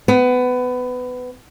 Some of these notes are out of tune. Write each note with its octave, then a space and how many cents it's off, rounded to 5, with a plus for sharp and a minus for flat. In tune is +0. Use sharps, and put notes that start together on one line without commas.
B3 +20